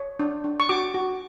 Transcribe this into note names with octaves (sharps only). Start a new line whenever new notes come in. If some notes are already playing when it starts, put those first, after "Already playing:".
Already playing: C#5
D4
D4
C#6
F#4 D6
F#4